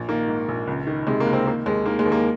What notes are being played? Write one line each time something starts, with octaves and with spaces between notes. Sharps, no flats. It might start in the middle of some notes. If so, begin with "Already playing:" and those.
Already playing: A#1
D#3 A#3
G#2
A#1
C#2
D#3
C3 G#3
A#3
C#2
C4
D#3 A#3
D#2 G#3
D#3 A#3
G#3
D#2
A#3